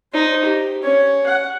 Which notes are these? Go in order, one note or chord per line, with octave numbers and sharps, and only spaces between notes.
D#4 C5
G4
C#4 C#5
F#5